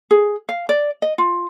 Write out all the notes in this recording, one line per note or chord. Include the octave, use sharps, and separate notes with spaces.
G#4
F5
D5
D#5
F4